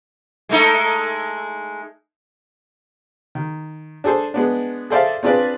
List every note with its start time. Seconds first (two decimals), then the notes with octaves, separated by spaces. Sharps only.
0.49 G#3 A3 D#4
3.35 D#3
4.04 D4 G#4 A4 C5
4.34 G#3 B3 D4
4.90 G#4 A4 C5 D5 E5 F5
5.23 C4 D4 F4 G#4 B4 D5